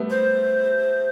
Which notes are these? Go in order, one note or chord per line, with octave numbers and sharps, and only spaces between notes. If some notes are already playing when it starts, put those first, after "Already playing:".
Already playing: G3 A3 B3
C5